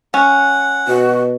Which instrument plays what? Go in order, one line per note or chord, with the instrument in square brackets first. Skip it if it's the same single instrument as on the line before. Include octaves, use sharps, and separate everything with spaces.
[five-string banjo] C#4 [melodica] F#5
[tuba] B2 [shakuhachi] F#4